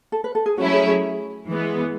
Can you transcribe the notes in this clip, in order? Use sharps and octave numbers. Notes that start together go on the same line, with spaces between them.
A4
B4
A4
G#4
F#3 A3 C#4 E4 F#4
G#4
G#4
E3 G#3 B3